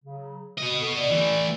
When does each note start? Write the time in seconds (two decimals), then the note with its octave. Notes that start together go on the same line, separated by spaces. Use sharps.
0.05 C#3 F#3
0.58 B2 B3 D#5
0.79 A4 C#6 D#6
0.95 D5
1.11 E3 A3